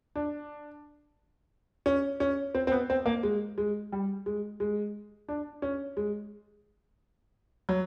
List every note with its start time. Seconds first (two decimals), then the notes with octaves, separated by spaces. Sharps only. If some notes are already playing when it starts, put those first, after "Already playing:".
0.15 D4
1.86 C#4
2.20 C#4
2.55 C4
2.67 C4
2.72 B3
2.90 C4
3.06 A#3
3.23 G#3
3.58 G#3
3.92 G3
4.26 G#3
4.60 G#3
5.28 D4
5.62 C#4
5.97 G#3
7.69 F#3